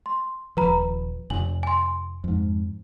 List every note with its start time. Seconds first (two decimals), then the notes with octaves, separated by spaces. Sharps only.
0.06 C6
0.57 D#1 F3 B4 A#5 B5
1.30 F1 G#5 F#7
1.63 G#5 C6
2.24 F2 G#2